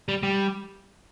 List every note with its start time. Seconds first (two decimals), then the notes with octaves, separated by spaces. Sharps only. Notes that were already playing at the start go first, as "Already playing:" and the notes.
0.09 G3
0.23 G3